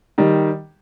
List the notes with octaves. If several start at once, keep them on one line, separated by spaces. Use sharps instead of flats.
D#3 G3